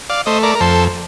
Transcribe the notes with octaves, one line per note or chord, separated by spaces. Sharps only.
D5 F5
A3 C5 D#5
A#4 D5
A#4
F2 A4 C5